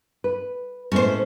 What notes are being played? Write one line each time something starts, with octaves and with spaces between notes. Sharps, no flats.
B4
A2 G#3 B3 C#4 C5